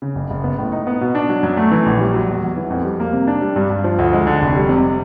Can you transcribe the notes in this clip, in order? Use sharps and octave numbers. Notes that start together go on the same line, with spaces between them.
C#3
F#1
F#1
B3
A2
D#4
B3
B2
D4
F#3
F#2
A3
E3
A#1
G3
F#3
E2
E2
E3
F2
G3
A#3
C3
D4
G3
G2
G2
F3
D2
G#3
D3
F1
G3
C3